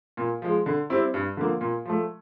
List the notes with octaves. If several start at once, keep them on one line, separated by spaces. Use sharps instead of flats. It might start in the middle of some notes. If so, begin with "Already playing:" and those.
A#2
F3 G#3
D3
G3 C4 E4
G2
D3 F3 A#3
A#2
F3 A3